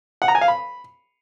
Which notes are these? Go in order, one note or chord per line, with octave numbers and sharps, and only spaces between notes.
F#5
A#5
G#5
F5
B5